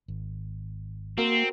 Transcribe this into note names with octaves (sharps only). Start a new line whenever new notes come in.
G#1
A#3 C4 F#4 A#4